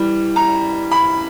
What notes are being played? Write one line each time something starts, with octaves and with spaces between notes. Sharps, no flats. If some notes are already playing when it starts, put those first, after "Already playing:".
Already playing: E3 G3
A#5
B5